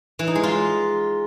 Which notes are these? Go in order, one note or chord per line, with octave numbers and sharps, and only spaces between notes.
E3
D#4
G#3
F4